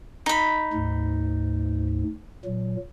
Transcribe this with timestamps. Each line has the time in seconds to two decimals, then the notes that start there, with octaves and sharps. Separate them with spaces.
0.26 D#4 B5
0.73 D2 G#2
2.45 A#2 F#3